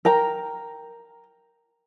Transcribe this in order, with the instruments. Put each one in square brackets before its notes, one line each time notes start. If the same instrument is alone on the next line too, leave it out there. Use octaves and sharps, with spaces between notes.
[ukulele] A#4 G5 A#5